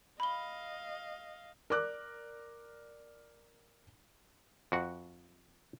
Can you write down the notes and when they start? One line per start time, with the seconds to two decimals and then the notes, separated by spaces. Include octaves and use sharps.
0.20 D#5 F5 B5 G7
1.70 A#4 D5 D6 F#6
4.72 F2 F#4 F#5